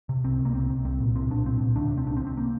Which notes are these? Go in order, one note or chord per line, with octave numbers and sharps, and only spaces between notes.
C3
C2 C4
C3
A#3
C2 C4
C3
C2 C4
A#2
C2 C4
A#2 D4
C2 C4
A#2
D2 D4
C3
C4
C2 D4
C4
C3
C4
A#3